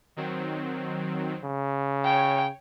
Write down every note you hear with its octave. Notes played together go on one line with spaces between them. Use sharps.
D#3 F#3 C4
C#3
C#5 G5